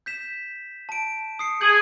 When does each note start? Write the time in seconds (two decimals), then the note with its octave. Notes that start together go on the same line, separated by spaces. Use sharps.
0.06 G6 B6 E7
0.89 A5 D7
1.39 D#6 C7 C#7
1.61 G#4 G6 G#6 F#7